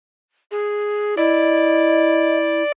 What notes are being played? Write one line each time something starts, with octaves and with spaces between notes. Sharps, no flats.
G#4
E4 D5 D#5